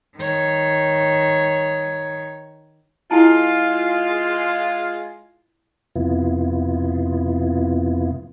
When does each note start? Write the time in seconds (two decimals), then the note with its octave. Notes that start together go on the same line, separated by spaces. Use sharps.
0.17 D#3 C#5
3.11 G#3 E4 F4 G#5 A5
5.96 F2 C3 B3 E4 F4